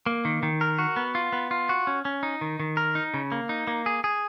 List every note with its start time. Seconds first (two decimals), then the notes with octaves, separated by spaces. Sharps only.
0.06 A#3
0.25 D#3
0.43 D#3
0.61 A#4
0.79 F#4
0.96 B3
1.15 F4
1.33 B3
1.51 F4
1.69 F#4
1.87 C#4
2.05 C#4
2.23 D#4
2.41 D#3
2.60 D#3
2.77 A#4
2.95 D#4
3.14 C#3
3.32 A#3
3.49 D#4
3.67 A#3
3.86 G#4
4.04 G#4